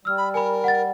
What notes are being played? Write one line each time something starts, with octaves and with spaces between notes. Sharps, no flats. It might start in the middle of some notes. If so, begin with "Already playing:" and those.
G3 E6 F6
B5
A#4 G#5 B5
F#5 A6